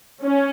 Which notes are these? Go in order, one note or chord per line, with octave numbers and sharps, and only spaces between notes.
C#4